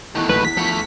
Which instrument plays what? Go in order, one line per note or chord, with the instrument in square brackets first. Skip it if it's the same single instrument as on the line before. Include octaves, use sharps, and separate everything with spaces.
[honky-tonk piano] E2 F#6 [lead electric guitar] D#3 A3
[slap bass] A1 A#2 F#3 [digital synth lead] B4
[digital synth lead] B6
[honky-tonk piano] E2 C#6 [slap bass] F3 [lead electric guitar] A3 F#5